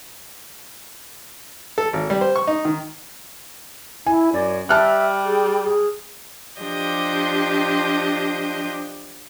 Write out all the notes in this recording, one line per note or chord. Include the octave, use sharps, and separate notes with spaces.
A4
G#1
G3
C5
C#6
D#4
D#3
E4 G#5
F#2 D5
G3 E5 A5 F6 F#6
G#4
G#4
F3 D4 G4 D#5 G6